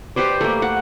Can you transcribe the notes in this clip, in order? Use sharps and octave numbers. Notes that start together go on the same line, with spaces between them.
G4 B4 C5 D5
A3 A#3
F#5